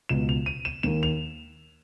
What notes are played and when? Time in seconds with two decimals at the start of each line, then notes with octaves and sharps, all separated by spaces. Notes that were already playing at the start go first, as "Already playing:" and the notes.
0.09 C#2 B2 E7
0.29 F7
0.46 D#7
0.65 E7
0.83 D#2 D#3 E7
1.03 F7